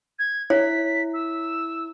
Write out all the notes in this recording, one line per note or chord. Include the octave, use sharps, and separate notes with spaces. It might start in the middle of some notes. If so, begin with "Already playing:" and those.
G#6
E4 C#5 B6
E6